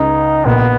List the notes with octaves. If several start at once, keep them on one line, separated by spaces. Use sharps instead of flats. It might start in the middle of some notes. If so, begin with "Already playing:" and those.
Already playing: C#2 C#3 D#4
A#1 A#2 B3